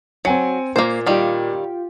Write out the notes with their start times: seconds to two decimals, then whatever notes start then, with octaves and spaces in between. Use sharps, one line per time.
0.25 F#3 C4 G#5 C#7
0.76 A#2 A#3 C5
1.06 D#3 G3 F4 G4